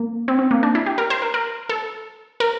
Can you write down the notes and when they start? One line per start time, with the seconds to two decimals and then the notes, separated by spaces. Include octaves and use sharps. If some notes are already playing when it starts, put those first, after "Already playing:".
Already playing: A#3
0.28 C4
0.39 C4
0.51 A#3
0.63 D4
0.75 E4
0.86 G4
0.98 A#4
1.10 C5
1.22 A#4
1.34 A#4
1.69 A4
2.40 A#4